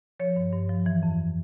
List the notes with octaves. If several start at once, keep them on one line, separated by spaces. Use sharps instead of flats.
F3 C#5
G2
G2
F3
E3
F2